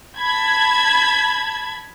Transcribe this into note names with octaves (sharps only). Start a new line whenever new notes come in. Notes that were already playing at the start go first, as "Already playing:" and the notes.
A5 B5 G#6